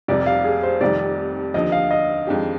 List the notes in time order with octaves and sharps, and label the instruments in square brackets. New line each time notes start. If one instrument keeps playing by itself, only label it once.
[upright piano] F1 F2 C3 G3 [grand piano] D5
[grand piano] F5
G#4
C5
[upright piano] F1 F2 C3 D#3 G3 [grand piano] D5
[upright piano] D#2 D3 F3 [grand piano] D#5
[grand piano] F5
D#5
[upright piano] F2 D#3 G#3 D4 G4